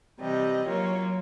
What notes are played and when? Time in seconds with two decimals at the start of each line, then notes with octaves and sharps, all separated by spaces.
0.19 C3 E3 G3 D#5
0.67 F#3 A#3 F4 C#5